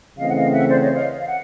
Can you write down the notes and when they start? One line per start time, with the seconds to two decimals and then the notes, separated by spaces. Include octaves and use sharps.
0.18 C#3 E3 A3 C4 D#5 F5
0.29 F#5
0.34 D#5 F5
0.52 E5 F#5
0.69 C5 D5
0.80 C#5 D#5
0.93 D#5 F5
1.19 F5
1.27 F#5